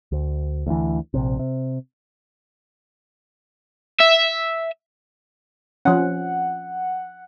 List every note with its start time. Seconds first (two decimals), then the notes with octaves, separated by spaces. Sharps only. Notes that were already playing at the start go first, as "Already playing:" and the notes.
0.12 D2
0.67 D2 E3
1.14 A#1 C3
1.39 C3
4.00 E5
5.85 F3 C#4 F#5